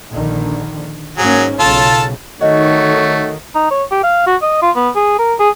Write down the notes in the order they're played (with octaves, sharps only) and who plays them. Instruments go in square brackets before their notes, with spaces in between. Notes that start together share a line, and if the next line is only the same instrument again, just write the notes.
[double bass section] A#1 D3 D#3
[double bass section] G#2 A#3 C#4 [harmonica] F#3 G#4
[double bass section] B1 C#3 [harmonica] F4 A4 A5
[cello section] D#3 [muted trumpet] A3 [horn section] F#4 A4 C#5 [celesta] D#5
[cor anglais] D#4
C#5
G4
F5
F#4
D#5
F4
B3
G#4
A#4
G#4